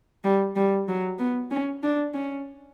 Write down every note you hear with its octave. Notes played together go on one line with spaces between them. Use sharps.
G3
G3
F#3
B3
C#4
D4
C#4